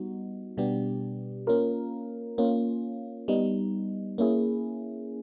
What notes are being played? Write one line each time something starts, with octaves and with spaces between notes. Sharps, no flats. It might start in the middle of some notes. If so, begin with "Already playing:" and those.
Already playing: G3 B3 D#4 F#4
B2 G3 B3 D4 G4
A#3 C#4 F4 A#4
A#3 C#4 F4
G3 B3 D#4
A#3 C#4 E4 G#4